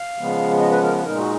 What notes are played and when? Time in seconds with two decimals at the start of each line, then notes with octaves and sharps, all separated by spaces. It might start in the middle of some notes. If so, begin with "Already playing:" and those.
Already playing: F5
0.19 C#3 F3 G#3 B3
0.60 D#5
0.71 B4
0.83 A#4
1.05 A#2 G#3 D#4 A#4
1.18 F#4